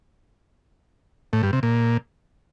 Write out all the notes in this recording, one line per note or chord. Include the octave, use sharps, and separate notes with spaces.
A2
G2
C3
A#2